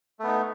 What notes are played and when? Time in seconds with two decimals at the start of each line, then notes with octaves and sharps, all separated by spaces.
0.19 A3
0.24 B3
0.28 D#4